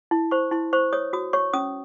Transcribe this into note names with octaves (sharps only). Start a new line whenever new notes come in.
E4
C5 C#6
E4 C6
C5 C#6
C#5 D#6
F#4 D#6
C#5 C#6
C#4 D#6